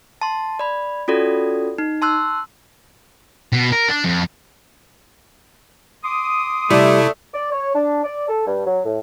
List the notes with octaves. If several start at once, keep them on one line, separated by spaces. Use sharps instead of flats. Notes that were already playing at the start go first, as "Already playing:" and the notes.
A5 C6
D5 B5
C#4 F4 F#4 A4 D5
D#4
A5 C6 E6 F#6
B2
A#4
D4
F2
C6 D6 D#6
C3 G3 A3 E4
D5
C#5
D4
D5
A4
G2
F#3
A2